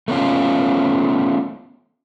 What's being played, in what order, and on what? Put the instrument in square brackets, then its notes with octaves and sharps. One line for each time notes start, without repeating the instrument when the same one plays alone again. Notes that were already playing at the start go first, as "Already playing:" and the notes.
[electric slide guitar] A3 B3 C#4 F4